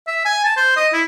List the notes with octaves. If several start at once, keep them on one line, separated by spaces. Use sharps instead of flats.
E5
G#5
A5
C5
D#5
E4